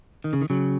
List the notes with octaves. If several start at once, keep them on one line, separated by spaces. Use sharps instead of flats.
D#3
C#3
D#3
C#3 F#3